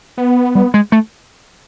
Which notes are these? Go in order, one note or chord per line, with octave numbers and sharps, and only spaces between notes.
B3
G3
G#3
A3